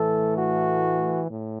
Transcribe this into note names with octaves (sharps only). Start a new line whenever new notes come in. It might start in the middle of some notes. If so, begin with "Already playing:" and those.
Already playing: A2 E3 A3 A4
F#4
A2